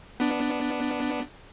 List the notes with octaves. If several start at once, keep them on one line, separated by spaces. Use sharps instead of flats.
B3 D4